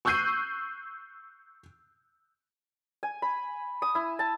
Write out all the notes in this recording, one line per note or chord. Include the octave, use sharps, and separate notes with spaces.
C#6 E6 F#6 G6 C7 D#7
G#5
B5
D#6
E4
A5